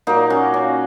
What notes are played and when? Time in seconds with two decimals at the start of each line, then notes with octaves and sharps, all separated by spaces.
0.07 A#2 F#3 A#3 D#4
0.30 C#4 F#4
0.54 C#4